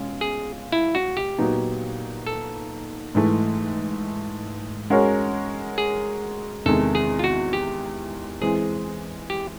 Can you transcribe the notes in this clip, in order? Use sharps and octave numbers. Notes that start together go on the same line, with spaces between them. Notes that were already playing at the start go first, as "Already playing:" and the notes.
Already playing: B2 G#3 C#4 F4
G#4
E4
F#4
G4
A#2 F#3 B3 D#4
A4
G#2 E3 A3
G#3 C#4 F#4 A#4 C#5
G#4
E2 C3 D#3 G#3 A4
G#4
F4
F#4
G4
E3 G#3 C4 G#4
G4